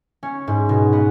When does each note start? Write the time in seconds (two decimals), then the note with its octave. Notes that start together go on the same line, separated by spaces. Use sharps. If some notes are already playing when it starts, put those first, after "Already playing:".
0.23 C#4
0.47 G#2
0.69 B2
0.93 B3